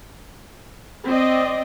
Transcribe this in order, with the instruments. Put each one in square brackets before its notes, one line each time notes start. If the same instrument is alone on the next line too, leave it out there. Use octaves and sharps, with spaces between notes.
[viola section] C4 D5 D#5